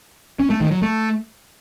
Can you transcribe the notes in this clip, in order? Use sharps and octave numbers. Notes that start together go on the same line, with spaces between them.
C#4
A3
D#3
F#3
A3